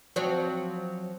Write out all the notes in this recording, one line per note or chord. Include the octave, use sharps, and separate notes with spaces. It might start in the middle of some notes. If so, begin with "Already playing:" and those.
F3 F#3 C4